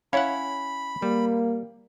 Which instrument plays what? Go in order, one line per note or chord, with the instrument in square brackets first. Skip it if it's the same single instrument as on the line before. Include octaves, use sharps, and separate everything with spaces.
[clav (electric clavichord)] C#4 E4 F#5 [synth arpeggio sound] C#5 F5 [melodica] B5
[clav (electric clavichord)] G3 [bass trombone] A#3